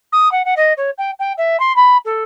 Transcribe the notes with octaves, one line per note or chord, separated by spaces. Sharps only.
D#6
F#5
F#5
D#5
C#5
G5
G5
E5
C6
B5
A4